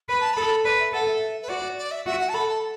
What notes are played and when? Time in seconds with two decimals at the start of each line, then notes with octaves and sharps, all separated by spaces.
0.09 B4 B5
0.21 A5
0.34 A4 B5
0.64 B4 D5
0.79 E5
0.93 A4 F#5
1.07 E5
1.42 B4
1.49 F#4 D5
1.78 D5
1.91 E5
2.06 F#4 E5
2.20 F#5
2.29 A5
2.34 A4 B5
2.49 A5